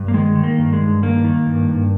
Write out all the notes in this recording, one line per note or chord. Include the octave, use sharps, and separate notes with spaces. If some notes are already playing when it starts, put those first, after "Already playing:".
Already playing: G2
A#3
D#3 G#3
D#3
A#3
G2
G#3
G2
D#3 A#3
D#3
G2
G2